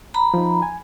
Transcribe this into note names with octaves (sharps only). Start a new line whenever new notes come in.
A#5 B5
F3 D#4
G#5